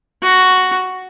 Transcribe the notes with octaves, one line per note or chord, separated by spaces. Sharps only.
F#4